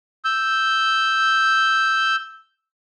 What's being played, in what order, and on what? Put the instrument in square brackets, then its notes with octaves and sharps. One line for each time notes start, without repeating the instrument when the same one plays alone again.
[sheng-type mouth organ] E6 G6